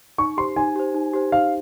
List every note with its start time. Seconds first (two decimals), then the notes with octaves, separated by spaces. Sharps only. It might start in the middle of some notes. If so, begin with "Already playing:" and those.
0.18 D#4 C#6
0.37 G4 C5 C6
0.56 D#4 G#5
0.75 G4 C5
0.94 D#4
1.13 G4 C5
1.32 D#4 F5